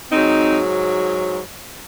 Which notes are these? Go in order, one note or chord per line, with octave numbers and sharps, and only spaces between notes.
G#2 F#3 C4 D#4